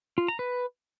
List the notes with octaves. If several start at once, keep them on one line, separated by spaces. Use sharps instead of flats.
F4
A#5
B4